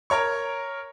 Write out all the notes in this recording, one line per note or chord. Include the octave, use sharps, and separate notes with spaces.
A#4 C#5 C#6